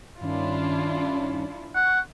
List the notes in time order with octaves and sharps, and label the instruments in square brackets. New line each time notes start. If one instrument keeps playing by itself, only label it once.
[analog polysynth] G2 D#3 C#4 [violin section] D4 E4 F4
[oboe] F#5 [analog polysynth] C#6